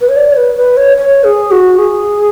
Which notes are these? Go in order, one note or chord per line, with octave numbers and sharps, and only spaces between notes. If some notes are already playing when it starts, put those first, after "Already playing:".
B4
C#5
D5
C#5
B4
B4
C#5
C#5
G#4
F#4
G#4